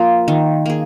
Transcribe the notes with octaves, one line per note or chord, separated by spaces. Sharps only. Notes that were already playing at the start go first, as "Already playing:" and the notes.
Already playing: F3 A#3 F4
D#3
A#3 G#4